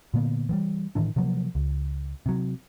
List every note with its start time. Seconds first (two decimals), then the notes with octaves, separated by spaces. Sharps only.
0.14 A#2 D3 A#3 B3
0.49 E3 F#3 G3
0.95 A2 D#3 E3 D4
1.16 C3 F3 F#3 A#3
1.55 C#2
2.26 C3 F#3